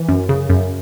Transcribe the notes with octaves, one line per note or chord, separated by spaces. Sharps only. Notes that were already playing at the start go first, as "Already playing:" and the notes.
Already playing: E3
F#2
C#3
F#2